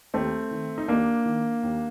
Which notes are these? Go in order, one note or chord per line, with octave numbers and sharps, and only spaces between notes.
D#2 A3 C4
D#3
D#4
D#2 A#3 D4
D#3
D#2